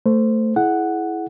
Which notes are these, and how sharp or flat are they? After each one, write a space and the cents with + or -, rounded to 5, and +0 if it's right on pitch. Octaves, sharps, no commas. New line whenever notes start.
A3 +15 C5 -10
E4 +0 G#4 +35 F#5 +0